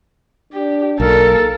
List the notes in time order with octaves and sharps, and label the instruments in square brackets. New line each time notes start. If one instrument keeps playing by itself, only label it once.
[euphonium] D4 [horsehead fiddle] G4
[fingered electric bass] B1 [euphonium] A#3 [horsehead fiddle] A4 A#4